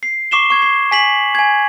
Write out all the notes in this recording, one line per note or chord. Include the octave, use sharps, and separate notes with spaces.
C7
C#6 D6 C7 E7 G7
C#6 G#6
C7
G#5 B6 F#7
G#5 G#6